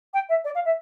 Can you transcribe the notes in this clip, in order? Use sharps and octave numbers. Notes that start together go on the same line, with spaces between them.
G5
E5
D5
F5
E5